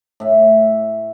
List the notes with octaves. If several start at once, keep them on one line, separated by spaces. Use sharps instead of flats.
A2 E5